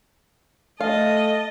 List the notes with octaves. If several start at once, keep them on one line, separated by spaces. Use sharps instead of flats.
A3 D#5 F5 A5